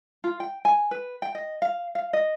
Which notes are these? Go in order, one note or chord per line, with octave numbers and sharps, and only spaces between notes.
F4
G5
G#5
B4
G5
D#5
F5
F5
D#5